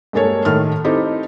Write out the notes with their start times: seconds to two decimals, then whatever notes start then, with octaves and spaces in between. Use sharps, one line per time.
0.13 G2 G#3 A#3 A4 C#5
0.45 A2 D#3 A4 F6
0.84 C4 D#4 E4 G4 A4 C5